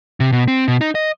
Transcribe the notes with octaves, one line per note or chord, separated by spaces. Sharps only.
C3
B2
C4
B2
D#4
D#5